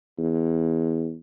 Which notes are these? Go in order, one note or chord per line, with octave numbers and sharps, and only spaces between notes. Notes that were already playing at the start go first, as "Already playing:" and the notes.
E2